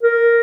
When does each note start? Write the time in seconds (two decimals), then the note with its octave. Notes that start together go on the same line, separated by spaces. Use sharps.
0.03 A#4